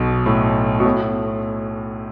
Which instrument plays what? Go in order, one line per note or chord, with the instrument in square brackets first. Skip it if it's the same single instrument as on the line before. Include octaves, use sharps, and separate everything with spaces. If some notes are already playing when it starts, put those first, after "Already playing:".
Already playing: [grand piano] B1 B2
A2
B2
A2